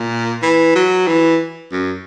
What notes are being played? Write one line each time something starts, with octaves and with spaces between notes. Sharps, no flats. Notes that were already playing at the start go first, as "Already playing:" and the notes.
Already playing: A#2
E3
F#3
E3
F#2